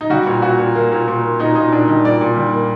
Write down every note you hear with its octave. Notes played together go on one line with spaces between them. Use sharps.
D#4
G3 F#4
A#2
A#2 F#4
A#2
A#3
A#2
A#2
A#3
A#2 D#4
A#2 D#4
A#2 D4
G3 D#4
A#2 D5
A#2
G3
A#3